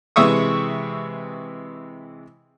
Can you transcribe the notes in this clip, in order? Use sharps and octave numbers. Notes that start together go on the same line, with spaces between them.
C3 E3 G#3 E5 C#6 D#6